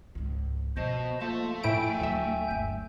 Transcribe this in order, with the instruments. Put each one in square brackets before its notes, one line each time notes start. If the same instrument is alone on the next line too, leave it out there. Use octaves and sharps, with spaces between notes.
[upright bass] C#2 G#2
[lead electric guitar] B2 [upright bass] F3 [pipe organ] C5 D#5 A5
[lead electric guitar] A3 [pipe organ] A#3 F4 A5
[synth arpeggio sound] A2 E4 D7 [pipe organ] G5 G#5 G6
[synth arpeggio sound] D2 E5 [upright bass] F#3
[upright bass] G1 A3